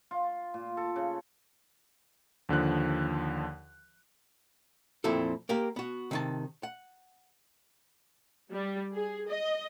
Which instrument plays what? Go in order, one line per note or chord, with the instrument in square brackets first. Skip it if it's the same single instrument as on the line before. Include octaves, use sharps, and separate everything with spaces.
[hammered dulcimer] F4
A#2
A4
C#3
[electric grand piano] D#2 D3 F3 F#6
[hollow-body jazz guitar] F2 A#2 C4 E4 A4
A#3 G4 A#4
B3 F#4
C3 D#3 A5
F#5
[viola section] G3
G#4
D#5